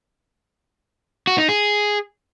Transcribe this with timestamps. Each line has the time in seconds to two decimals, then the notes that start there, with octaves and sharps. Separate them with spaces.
1.27 F#4
1.38 D#4
1.49 G#4